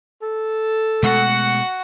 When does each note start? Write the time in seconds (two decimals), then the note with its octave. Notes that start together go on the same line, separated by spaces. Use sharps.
0.22 A4
1.03 B2 G#3 A3 F#4 F#5